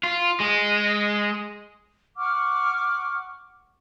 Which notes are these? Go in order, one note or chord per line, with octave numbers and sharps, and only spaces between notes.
F4
G#3
F#5 C#6 D6 F6